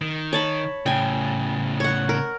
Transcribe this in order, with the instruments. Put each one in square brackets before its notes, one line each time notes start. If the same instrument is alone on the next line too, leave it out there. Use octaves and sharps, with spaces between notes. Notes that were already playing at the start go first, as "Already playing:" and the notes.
[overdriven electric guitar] D#3
[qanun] C#5 A5 B5
[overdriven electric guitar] A2 C#3 [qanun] G5 G#5
[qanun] C#5 F#5
A#4